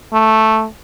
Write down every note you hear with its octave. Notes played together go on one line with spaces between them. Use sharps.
A3